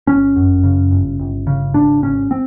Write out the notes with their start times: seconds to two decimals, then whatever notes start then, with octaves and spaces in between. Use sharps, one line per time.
0.07 G1 C#4
0.36 F#2
0.63 C#3
0.91 G1
1.19 G1
1.47 C#3
1.74 G#1 D4
2.03 G#1 C#4
2.31 C4